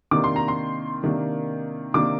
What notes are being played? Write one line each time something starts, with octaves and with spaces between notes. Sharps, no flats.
C3 D#3 A#3 D4 D6
C6
A#5
C6
C3 D#3 A#3 D4
C3 D#3 A#3 D4 D6